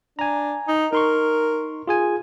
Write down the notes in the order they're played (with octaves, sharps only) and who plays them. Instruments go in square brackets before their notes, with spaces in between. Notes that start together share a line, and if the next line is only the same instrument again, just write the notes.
[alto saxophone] D4 [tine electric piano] G#5 A#5
[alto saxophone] D#4
[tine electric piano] D#4 C6 C#6 [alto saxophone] A#4
[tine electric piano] F4 G#4 G#5